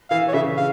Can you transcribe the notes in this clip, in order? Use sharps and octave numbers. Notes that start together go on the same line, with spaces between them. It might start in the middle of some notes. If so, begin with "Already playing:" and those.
E3 F5
C#5
C#3 E5
F5